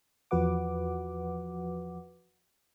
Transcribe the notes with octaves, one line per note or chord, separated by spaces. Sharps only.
E2 F3 F#4 B4 F#5 D6